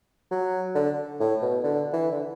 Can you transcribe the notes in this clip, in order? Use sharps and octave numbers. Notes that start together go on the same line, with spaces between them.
F#3
D3
A2
B2
D3
E3
D3